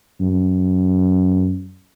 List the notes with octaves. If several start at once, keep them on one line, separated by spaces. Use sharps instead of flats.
F#2